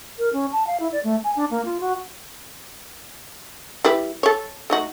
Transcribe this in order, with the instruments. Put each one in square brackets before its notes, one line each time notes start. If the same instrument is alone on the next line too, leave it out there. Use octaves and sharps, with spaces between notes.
[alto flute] A#4
C#4
A5
F5
E4
D5
A3
G#5
D4
A#3
F4
F#4
[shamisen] G3 E4 B4
A4 C#5
A3 D#4 F#4